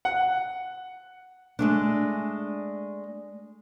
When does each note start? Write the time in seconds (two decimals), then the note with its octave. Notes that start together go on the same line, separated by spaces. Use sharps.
0.05 F#5
1.59 G#3 A3 D4